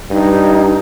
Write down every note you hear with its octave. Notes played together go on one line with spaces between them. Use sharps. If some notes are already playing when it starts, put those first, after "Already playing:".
G2 D#4